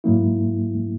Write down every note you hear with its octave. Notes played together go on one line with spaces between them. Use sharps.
G#2 F#3 A#3 E4